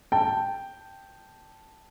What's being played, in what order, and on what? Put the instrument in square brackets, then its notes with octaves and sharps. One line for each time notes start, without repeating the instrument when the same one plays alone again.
[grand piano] G5 A5